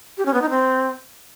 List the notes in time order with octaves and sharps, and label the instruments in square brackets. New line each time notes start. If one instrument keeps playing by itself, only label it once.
[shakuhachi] G4
C#4
B3
D#4
C4